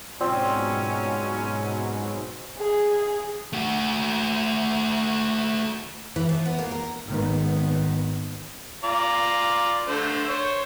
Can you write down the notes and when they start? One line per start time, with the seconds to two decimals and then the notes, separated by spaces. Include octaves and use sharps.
0.20 G#2 B2 F#3 C4 C#4 F4 D5
2.57 G#4
3.53 A3 F#4
6.16 E3
6.29 F3
6.45 B3
6.59 A#3
6.71 A#4
7.09 G#1 D#3 B3
8.84 F4 D5 A#5
9.88 D3 A3 C5
10.29 C5 C#5